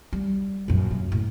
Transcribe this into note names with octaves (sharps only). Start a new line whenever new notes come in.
G3
A#1 F#2
C#3
A2